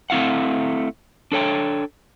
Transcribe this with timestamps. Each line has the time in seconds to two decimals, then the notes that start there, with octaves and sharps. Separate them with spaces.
0.10 A3 C4 E4 F5 F#5
1.32 D4 A4 C#5 G5